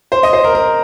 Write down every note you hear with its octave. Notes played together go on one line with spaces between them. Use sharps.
C5
D#5
C5
A#4
A#4